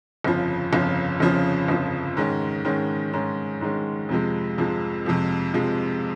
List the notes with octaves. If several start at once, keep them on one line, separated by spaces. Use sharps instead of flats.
G1 F2 C#3 F3
G1 F2 C#3 F3
G1 F2 C#3 F3
G1 F2 C#3 F3
G#2 D#3 G#3 C#4
G#2 D#3 G#3 C#4
G#2 D#3 G#3 C#4
G#2 D#3 G#3 C#4
F2 C3 F3 G#3
F2 C3 F3 G#3
F2 C3 F3 G#3
F2 C3 F3 G#3